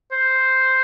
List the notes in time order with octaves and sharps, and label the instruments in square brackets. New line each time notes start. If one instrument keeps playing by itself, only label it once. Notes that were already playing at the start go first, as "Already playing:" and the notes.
[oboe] C5